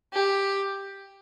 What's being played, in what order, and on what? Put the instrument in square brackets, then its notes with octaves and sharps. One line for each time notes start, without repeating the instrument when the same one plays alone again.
[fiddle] G4